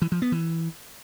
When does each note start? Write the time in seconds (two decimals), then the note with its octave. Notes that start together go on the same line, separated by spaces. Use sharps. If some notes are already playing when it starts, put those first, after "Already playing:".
0.02 E3
0.12 F3
0.22 B3
0.32 E3